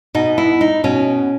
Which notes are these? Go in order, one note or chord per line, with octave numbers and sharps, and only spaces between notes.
B2 D#4
E4
D#4
B2 C#4